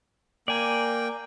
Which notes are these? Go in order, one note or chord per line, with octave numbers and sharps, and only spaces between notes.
A#3 D5 G5 G#5